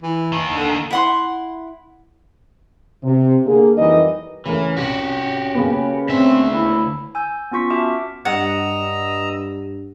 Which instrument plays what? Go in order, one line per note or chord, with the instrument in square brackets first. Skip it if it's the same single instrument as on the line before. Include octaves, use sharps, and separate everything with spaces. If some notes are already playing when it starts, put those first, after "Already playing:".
[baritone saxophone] E3
[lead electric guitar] D#2 D#3
[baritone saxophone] D3
[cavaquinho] E4 F#5 C6
[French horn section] C3
D3 A#3 G#4
F2 E3 G3 D#4 A#4 D#5
[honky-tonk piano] C#3 A3 A#4 [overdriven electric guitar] E3 [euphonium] C#4
[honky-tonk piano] C2 [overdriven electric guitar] F#4 G4
[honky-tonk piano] C#3 A#3 B3
[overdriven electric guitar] D2 E5 [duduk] C4
[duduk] E4
[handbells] G#5 E6 G6
B3 C#4 F4 C#6 B6
F#4 E5 A5 D6 F6
[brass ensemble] G2 [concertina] D#5 A#5 E6 [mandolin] F#5